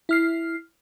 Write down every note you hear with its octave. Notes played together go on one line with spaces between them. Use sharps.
E4 F6 C7